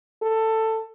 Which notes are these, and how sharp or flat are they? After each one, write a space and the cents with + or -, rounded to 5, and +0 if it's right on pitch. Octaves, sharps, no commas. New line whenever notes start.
A4 +15